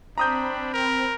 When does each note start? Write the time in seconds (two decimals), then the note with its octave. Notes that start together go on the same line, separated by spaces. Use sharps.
0.18 C4 D4 A#5 B5 D#6 G6
0.74 A#4